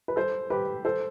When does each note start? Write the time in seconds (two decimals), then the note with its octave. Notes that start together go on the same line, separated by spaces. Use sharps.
0.08 B4
0.16 A4 C5
0.50 G4 B4
0.85 A4 C5